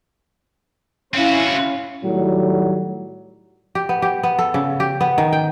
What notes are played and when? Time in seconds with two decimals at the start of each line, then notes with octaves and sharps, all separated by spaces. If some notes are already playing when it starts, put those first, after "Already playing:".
1.14 C4 C#4 E4 F#4 F5
2.04 A2 D#3 F#3 G3
3.75 G4
3.89 B3
4.02 G4
4.23 B3
4.39 A4
4.54 C#3
4.80 G4
5.01 B3
5.18 D#3
5.32 G5